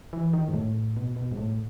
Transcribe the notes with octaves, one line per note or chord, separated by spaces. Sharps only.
E3
D#3
G#2
A2
B2
B2
G#2
A2